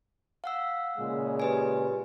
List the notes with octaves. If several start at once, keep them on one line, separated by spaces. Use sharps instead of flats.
F5 F#5 E6
A#2 C#3 G#3
G4 B4 G#5